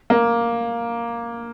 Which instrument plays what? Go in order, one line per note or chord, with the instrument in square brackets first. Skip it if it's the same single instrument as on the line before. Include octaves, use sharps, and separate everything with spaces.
[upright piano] A#3